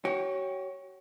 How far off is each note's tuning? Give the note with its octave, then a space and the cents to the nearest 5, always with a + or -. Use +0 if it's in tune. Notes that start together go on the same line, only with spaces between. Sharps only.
F#4 +45 C#5 +0 G5 +30